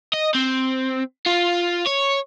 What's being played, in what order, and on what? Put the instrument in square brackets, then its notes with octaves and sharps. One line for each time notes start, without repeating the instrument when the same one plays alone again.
[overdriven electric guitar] D#5
C4
F4
C#5